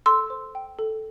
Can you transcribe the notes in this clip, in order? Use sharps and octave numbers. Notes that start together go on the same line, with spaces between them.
A4 C6 E6
C5
G5
A4